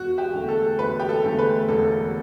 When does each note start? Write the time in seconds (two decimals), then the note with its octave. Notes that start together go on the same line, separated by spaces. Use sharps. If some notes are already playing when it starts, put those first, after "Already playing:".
Already playing: E1 F#4
0.18 G4
0.33 E2 D3 A3
0.49 A4
0.78 E1 B4
1.00 G4
1.09 A4
1.23 E2 D3 A3
1.39 B4
1.68 E1 A4